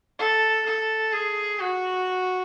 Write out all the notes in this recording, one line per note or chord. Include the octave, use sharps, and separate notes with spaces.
A4
A4
G#4
F#4